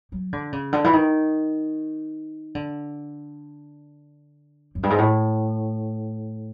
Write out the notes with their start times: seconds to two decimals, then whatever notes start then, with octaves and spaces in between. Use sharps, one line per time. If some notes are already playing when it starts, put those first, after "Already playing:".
0.12 F#3
0.33 D3
0.53 C#3
0.73 D3
0.84 E3
0.93 D#3
2.55 D3
4.75 F#2
4.83 G2
4.90 G#2
4.98 A2